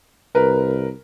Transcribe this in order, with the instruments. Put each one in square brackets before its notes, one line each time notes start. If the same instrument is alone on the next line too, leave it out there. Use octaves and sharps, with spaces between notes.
[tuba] C2 [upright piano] A#4 B4